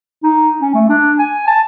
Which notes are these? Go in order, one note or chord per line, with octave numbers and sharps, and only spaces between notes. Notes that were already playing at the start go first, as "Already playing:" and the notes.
D#4
C#4
A3
D4
G#5
A5